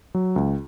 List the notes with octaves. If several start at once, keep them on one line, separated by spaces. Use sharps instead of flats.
F#3
C#2